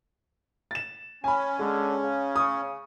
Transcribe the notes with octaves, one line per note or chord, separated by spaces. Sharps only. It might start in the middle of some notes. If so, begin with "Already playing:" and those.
A6 E7
C#4 G#5 B5
D3 G#3
C#3
C#6 D#6